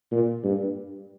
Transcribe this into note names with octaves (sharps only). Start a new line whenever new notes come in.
A#2
G2